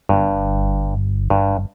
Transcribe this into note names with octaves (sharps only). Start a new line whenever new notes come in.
G1 G2
G1 G2